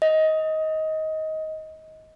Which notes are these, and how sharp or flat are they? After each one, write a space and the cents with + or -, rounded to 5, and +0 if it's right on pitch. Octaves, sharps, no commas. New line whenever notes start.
D#5 +20